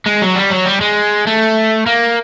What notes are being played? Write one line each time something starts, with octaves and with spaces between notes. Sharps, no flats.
G#3
F#3
G3
F#3
G3
G#3
A3
A#3